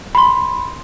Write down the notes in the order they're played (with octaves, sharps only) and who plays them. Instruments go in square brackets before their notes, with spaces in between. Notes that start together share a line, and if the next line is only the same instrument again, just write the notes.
[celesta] B5 C6